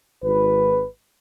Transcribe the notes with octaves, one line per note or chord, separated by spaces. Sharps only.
G#1 B4